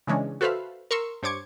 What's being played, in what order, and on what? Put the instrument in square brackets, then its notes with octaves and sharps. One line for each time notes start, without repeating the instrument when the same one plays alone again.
[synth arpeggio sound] C#3 E3 G#3 C#4 D4
F#4 A4 B4 C5 E5 F5
A#4 C6 C#6 E6
G2 C5 C#5 D6 G#6 C#7